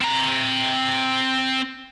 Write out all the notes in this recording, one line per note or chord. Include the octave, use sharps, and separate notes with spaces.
C4 A#5